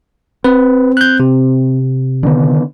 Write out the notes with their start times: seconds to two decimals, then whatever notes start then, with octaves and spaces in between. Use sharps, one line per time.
0.44 C4 B4
0.97 F#6 G6
1.20 C3
2.23 D3 D#3 B3